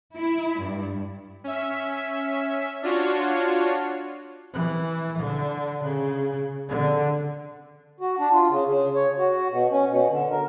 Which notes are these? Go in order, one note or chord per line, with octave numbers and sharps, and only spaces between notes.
E4
G2
C#4 E5
D4 F4 F#4 C#5
E3
D3
C#3
D3
F#4
D4
F4
C#3
C#3
C#5
F#4
B2
C#4
B2
D3
A#4